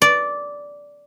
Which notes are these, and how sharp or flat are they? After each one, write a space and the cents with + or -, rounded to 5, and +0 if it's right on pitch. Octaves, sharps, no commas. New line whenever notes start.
D5 -10